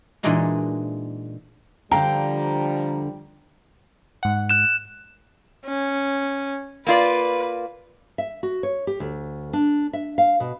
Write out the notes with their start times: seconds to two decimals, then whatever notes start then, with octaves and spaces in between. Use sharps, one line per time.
0.23 A#2 E3 G#3 D4 D#4 F#4
1.92 D3 F3 G3 A4 F5 G5 A#5
4.23 G#2 F#5
4.50 F#6 E7
5.66 C#4
6.87 A#3 F4 B4 D5
8.18 E5
8.43 F#4
8.63 C#5
8.87 G4
9.00 D2
9.53 D4
9.93 E5
10.18 F5
10.40 B2